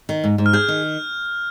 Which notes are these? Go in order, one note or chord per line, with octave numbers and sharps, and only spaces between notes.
D#3
G#2
G#2
F6
G#4 G6
D#3